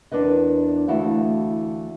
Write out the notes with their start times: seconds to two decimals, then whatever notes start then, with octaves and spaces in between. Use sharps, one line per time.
0.11 E2 D4 A#4 B4 D#5
0.88 D2 E3 A3 E4 F#4 F5